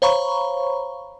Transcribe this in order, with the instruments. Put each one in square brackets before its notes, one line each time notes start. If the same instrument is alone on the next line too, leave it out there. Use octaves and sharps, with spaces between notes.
[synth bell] C5 C#5 F5 A#5 B5 C#6